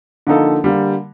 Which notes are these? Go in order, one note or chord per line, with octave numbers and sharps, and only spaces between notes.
D3 F3 A#3 D#4 A4
D3 G3 A#3